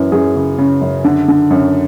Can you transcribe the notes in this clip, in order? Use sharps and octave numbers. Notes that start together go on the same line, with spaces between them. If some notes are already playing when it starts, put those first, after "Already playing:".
Already playing: F#2 E3
F#2 G#4
C#3
C#3
F#2
D3
D3
F#2